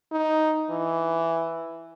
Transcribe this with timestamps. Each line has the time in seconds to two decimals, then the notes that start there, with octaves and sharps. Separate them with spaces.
0.12 D#4
0.70 E3